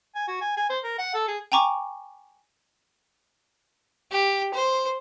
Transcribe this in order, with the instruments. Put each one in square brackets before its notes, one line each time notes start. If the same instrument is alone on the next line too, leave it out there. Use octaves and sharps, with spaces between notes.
[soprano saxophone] G#5
F#4
G#5
G#5
C5
A#4
F#5
A4
G#4
[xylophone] G5 G#5 A#5 C#6 D6
[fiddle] G4
C5